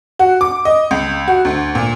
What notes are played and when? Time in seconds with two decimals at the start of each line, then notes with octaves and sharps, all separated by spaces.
0.19 F#4
0.41 D6
0.65 D#5
0.91 C#2
1.28 F#4
1.45 D2
1.75 A#2